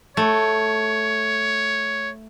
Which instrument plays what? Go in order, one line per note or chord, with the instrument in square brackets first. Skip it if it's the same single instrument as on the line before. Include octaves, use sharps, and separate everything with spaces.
[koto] A3 [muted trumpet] C#5